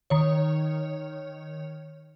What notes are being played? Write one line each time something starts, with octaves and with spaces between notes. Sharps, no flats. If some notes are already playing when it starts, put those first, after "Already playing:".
D#3 C#5